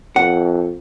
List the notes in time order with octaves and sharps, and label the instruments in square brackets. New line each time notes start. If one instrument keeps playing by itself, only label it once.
[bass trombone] F2 [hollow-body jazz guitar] F#5